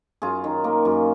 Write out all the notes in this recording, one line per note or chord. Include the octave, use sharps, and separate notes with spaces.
F#2 F4 G#4
D#3
A#3
F#2